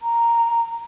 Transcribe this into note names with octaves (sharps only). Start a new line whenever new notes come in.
A#5